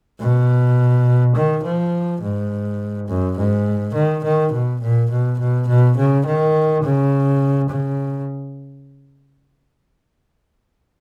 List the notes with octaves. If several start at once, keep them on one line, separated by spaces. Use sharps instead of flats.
B2
D#3
F3
G#2
F#2
G#2
D#3
D#3
B2
A#2
B2
B2
B2
C#3
D#3
C#3
C#3